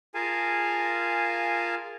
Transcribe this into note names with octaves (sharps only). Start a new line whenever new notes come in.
F4 G#4 A#4 F5 G#5 A5